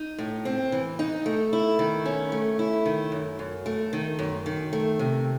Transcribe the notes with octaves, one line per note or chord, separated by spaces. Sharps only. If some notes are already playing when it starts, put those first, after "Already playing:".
Already playing: D#4
A2
C4
E3
D#4
A3
E4
D#3
C#4
A3
E4
D#3
F#2
F#2
A3
D#3
F#2
D#3
A3
C3